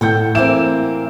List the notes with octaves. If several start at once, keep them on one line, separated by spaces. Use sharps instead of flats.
A2 A4 F#5 G5 G6
E3 A#3 C4 E7